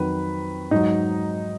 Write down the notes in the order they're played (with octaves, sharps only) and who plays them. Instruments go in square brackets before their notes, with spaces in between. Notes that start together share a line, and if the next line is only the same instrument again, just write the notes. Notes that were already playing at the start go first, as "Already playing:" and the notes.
Already playing: [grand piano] F2 D#3 F#3 B4
G#2 F#3 D#4